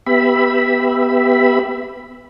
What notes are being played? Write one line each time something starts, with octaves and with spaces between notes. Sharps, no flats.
B3 G4 E5 B5